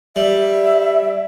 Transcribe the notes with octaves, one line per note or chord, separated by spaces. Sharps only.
G3 E5